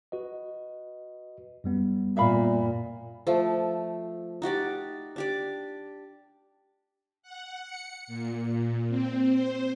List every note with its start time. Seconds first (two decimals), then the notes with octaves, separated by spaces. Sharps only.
0.12 F#4 B4 D#5
1.64 F#2 G3 B3
2.17 A#2 E5 F5 B5
3.27 F3 A3
4.42 D#4 F#4 G4 D5
5.16 D4 G4 D5
7.22 F#5
7.63 C#7
8.07 A#2
8.45 A#2
8.88 C4
9.30 C5